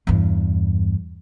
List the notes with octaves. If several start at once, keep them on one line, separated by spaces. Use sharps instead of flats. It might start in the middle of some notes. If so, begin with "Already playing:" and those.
E2 G2